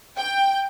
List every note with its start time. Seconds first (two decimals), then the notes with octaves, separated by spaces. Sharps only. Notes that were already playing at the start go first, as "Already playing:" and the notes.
0.19 G5